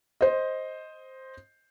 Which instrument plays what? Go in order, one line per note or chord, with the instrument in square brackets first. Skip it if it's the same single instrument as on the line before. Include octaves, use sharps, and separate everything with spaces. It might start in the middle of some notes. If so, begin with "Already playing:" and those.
[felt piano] C5 D#5